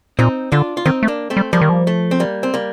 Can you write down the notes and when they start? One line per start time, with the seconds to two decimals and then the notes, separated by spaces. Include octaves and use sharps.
0.19 A#2 C4 D#4
0.52 D3 D4 F4
0.77 F4
0.86 D#3 C4 D#4
1.03 A3
1.08 A#3 D4
1.30 A3 C4
1.37 G3
1.53 F3 G3 A#3
1.61 D#3
1.69 F3
1.87 A3
2.11 C4
2.20 G3 A#3
2.43 C4
2.54 G3 A#3